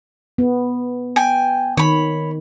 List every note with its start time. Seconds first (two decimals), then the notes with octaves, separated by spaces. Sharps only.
0.38 B3
1.16 G5 G#5
1.77 D#3 C#5 B5